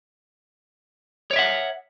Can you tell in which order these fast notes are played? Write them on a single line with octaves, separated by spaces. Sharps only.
C#5 D5 E5 F#5